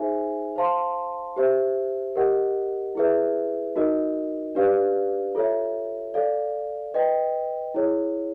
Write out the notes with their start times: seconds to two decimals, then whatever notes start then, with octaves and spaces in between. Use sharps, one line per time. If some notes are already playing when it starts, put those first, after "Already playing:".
Already playing: D#4 G#4 C5 E5 G#5
0.56 C5 F5 A5 C6
1.36 G4 C5 E5
2.16 G4 A#4 D#5 F#5
2.95 E4 G#4 B4 E5
3.76 D#4 F#4 A#4 D#5
4.55 D4 G4 B4 D5 F5
5.35 F4 A4 C#5 E5
6.14 A4 D5 F5
6.94 B4 D#5 G5
7.74 E4 G#4 C#5